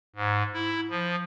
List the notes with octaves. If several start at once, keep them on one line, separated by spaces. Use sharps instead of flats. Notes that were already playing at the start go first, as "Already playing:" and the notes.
G#2
E4
F3